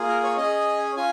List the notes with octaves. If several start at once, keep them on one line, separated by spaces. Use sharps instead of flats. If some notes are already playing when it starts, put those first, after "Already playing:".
Already playing: A#3 F4 G#4
A#4
C#5
C#4 G#4 D#5
C#4 F4 G#5